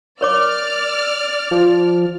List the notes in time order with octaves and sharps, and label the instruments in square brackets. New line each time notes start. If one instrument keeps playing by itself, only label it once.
[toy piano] A#4 C#5 D6 [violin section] D5 F6
[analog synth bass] F3